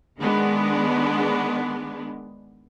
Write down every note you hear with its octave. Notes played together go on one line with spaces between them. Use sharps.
D#3 G#3 B3 D4